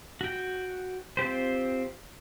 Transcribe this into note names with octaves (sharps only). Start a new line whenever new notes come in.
F#4 G5
C4 F4 G4 C5